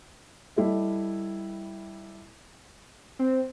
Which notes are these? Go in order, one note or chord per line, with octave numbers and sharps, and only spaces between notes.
G3 E4 A4 D#5
C4